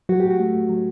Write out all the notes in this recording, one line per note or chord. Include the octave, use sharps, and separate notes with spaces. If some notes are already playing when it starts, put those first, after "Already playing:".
F#3 F#4
A2 G4
F#4
A3
A2
F#3